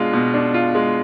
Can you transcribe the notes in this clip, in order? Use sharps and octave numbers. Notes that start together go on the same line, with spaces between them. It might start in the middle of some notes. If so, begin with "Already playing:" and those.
Already playing: B2 G#3 D4 F4
B2
D4
F4
G#3